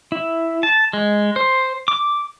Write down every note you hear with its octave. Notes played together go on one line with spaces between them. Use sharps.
E4
A5
G#3
C5
D6